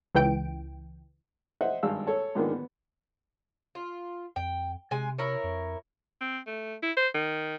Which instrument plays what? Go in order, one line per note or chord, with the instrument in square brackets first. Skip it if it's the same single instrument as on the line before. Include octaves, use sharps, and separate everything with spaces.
[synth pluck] C#2 E3 G5 D7
[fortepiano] C5 D#5 E5 F#5
G#1 G2 G#3 F5 E6
A4 C#5 A5
G#2 D3 D#3 F3 A#3 B3
B3
[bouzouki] F4
[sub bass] F2 [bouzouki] G5
[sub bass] C3 [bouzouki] G#3 G#5
[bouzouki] E4 A#4 C#5
[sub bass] F2
[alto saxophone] C4
A3
E4
C5
D#3